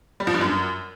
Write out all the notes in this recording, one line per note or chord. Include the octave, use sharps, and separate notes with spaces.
G3
F3
G2
F#2